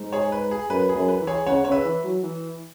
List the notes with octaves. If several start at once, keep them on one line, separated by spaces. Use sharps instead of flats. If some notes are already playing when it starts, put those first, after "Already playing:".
Already playing: G#2
G#4 C#5
B4
G#4
F#2 B4
G#4
F#2
B4
E3
G#4 C#5
C#3 C#5 F#5
C#3 C#5
B4 E5
E3
F#3
E3